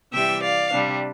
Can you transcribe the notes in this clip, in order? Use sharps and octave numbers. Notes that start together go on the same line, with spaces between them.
C3 E3 G3 E5 G5
D5 F5
C3 G3 D4